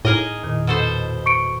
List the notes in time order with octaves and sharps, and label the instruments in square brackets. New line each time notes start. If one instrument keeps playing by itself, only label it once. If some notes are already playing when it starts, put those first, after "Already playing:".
[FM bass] A2 [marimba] D#4 [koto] G#4 A#4 D#5
[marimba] E2 A#2 D#3
[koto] B2 A4 C5
[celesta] C#6 C#7 D7